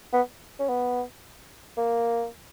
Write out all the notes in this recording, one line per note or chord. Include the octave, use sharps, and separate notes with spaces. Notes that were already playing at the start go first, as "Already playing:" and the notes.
B3
C#4
B3
A#3